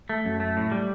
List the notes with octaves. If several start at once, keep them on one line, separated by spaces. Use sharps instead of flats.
A3
F#2
A3
A2
G3